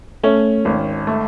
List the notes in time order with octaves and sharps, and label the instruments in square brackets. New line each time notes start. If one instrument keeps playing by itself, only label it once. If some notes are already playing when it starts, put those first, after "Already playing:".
[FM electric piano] A3 [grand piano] C#4
[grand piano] G#1
A3